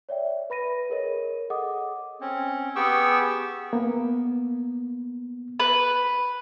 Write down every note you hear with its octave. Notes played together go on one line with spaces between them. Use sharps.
C#5 D5 E5 G5
B4 B5 A#6 D#7
G#4 A#4 C#5 D#5
G#4 A4 D#5 F#5 D6 D#6
C4 C#4
B3 G4 G#4 G5 C#6 E6
A#3 B3
B4